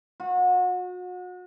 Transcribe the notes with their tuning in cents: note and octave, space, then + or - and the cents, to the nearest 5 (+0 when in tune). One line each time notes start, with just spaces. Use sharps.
F#4 -35